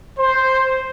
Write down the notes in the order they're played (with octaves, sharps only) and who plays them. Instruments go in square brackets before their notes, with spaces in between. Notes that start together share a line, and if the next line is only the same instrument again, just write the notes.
[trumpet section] C5